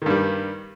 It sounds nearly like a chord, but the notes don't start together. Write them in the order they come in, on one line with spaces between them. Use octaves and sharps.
D#3 G2 G3